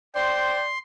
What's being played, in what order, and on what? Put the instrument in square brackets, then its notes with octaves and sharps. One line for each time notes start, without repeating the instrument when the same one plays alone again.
[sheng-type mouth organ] C5 [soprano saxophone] D5 [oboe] G5 [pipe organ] C6